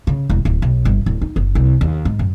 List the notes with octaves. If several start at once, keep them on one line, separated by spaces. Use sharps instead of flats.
C#3
E1
D1
B1
G1
D1
D#4
F#1
C2
D#2
G#2
F#2